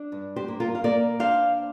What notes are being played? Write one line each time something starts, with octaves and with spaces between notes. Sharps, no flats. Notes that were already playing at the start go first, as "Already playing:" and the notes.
Already playing: D4
G2
G4 C5
A#3
F4 A#4
F5
A#3 A#4 D5
D4 C5 F5